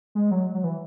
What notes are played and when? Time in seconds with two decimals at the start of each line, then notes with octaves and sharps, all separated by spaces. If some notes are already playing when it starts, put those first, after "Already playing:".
0.15 G#3
0.31 F#3
0.54 F#3
0.64 E3